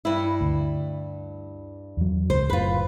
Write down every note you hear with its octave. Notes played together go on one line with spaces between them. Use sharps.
G2 E4
D2
E2 F#3
C#2 C5
F#1 F#2 A2 F4 B4